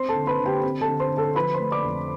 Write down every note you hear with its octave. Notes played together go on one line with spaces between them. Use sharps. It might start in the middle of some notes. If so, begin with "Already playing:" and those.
Already playing: C4 C5 C6
A4 A5
D3
B4 B5
D3
G4 G5
C4
A4 A5
D3
C5 C6
D3
A4 A5
F3 B4 B5
C5 C6
A3
D5 D6
F2